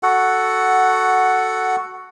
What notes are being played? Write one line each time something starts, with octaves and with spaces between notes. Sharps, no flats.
F#4 A4 F#5